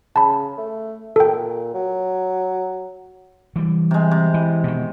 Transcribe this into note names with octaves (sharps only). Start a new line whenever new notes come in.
C#3 A5 B5
A3
A#2 A4 G5
F#3
E3 G3
C3 G#3
C3
E3
B2 D#3